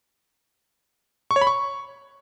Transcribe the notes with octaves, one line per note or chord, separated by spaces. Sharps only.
C#6
C#5
B5
C#6